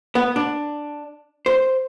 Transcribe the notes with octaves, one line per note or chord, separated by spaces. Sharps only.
B3
D4
C5